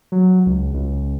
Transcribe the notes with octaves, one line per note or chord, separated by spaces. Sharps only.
F#3
C#2
C#2